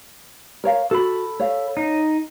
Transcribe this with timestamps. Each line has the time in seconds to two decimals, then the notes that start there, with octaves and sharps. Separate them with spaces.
0.64 A#4 C#5 F5
0.91 F#4 A4 B5
1.40 C#5 F5
1.77 D#4